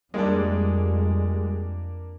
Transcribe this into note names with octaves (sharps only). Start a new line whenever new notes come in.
F2 G3 G#3 A#3 D4